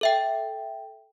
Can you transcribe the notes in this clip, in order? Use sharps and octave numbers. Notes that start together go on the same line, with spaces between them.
A4 E5 G5